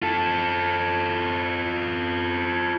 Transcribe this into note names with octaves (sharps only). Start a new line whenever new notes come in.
F4 A4